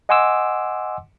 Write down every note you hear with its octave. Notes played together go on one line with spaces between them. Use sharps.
D#5 F#5 G#5 C6 D6 E6